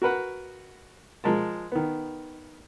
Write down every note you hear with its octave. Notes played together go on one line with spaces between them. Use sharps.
F#4 A#4 B4 F#5
F3 G#3 A#4 A5
D#3 B3